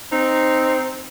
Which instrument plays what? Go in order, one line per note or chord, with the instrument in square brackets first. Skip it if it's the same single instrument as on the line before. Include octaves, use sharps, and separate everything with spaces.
[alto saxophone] C4 [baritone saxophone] D#4